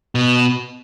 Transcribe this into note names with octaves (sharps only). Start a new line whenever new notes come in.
B2